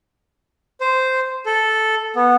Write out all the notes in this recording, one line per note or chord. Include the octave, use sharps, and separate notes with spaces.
C5
A4
B3